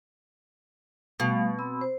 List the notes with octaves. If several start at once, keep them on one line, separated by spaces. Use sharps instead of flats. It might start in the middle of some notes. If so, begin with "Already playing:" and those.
B2 G3 A3 F5
C4 B5 E6
C5